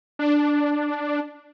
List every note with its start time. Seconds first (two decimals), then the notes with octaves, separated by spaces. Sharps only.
0.19 D4